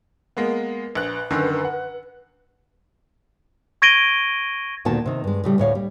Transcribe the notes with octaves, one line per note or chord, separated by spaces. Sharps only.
G#3 A#3 B3
A#1 B4 F#6
F#2 D3 D#3
F#5
C#6 G#6 A#6 D7 D#7 G7
D2 A#2 D#3 B3 F#4 A5
C3 D#3
G2 G#3
A2 C#3 G3
D2 A2 C#5 F5
G3